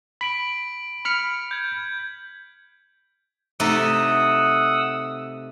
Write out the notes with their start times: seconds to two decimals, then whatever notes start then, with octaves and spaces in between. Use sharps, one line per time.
0.21 B5 B6 D7 F#7
1.05 B5 F6 C#7
1.51 G6 G#6
3.60 C3 A3 D#4 F#5 D#6 E6